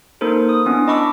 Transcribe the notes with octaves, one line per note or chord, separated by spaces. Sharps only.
A#3 D#4 A4 A#4 C5
D#6
B3 C#4 D4 E4
D#5 A5 B5 C#6 D6 E6